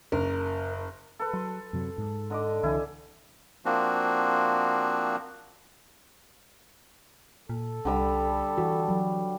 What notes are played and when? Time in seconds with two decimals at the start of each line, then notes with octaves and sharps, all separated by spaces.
0.12 F#1 A#4
1.19 A4 B4
1.33 F#3 C6
1.73 F#2 C3 F#3
1.98 G#2
2.30 D3 D#5 D6
2.63 C2 D3 E3 E4 G#5
3.65 F3 A#3 C4 D4 F#4
7.49 A#2 A4
7.85 C2 D3 G3 B5
8.58 E3 F#4
8.88 F#3